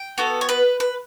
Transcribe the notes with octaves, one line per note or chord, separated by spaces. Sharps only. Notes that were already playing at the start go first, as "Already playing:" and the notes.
Already playing: G5
B3 F#4 A4
C#5
B4
B4